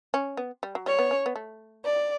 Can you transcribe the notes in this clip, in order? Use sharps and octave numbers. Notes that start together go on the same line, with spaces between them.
C#4
B3
G3
F#3
G3 C#5
B3
C#4
B3
A3
D5